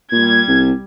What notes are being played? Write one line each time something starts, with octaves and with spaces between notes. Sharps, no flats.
A#2 G3 G#6
C2